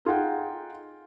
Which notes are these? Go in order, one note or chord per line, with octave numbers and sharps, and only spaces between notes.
D#4 F4 G#4 F#5 G5